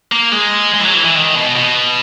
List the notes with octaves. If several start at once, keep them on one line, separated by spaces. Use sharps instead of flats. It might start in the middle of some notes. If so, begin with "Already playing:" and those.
A#3
G#3
G#3
E3
F#3
E3
E3
D#3
B2
B2